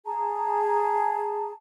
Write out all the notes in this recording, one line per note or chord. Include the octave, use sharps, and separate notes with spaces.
G#4 A5 A#5